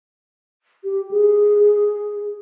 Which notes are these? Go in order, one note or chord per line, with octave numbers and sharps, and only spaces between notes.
G4
G#4